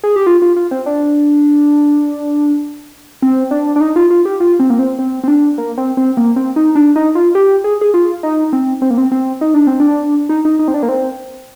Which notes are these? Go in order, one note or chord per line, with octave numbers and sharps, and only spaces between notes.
G#4
G4
F4
F4
F4
C4
D4
C4
D4
D4
D#4
F4
F4
G4
F4
C4
A#3
C4
C4
C4
D4
A#3
C4
C4
A#3
C4
D#4
D4
D#4
F4
G4
G#4
G#4
F4
D#4
C4
C4
A#3
C4
C4
D#4
D4
C4
D4
D#4
D#4
D#4
C4
D4
A#3
C4